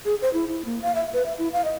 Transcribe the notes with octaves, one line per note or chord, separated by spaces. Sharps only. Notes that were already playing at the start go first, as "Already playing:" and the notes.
G#4
C5
E4
E4
A#3
F5
E5
B4
E5
E4
F5
D#5